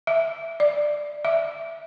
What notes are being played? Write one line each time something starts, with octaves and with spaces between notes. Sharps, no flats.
E5
D5
E5